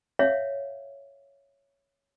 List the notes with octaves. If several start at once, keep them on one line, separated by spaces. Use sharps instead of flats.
C#5 E5 F5